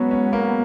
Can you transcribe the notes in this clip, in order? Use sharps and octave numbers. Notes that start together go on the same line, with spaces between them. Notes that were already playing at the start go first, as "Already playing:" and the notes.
Already playing: F#3 G#3 B3 C#4
C#4
A#3